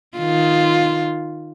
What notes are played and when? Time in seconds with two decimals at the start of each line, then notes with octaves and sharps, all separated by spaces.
0.17 D#3 F4